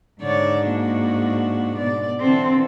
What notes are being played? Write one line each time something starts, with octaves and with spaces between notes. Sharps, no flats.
G#2 D3 C#5 D5
A#3 D4 F#4
B2 D5
D3 E3 C4 A4